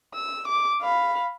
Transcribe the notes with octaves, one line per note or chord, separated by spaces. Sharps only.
E6
D6
F5 B5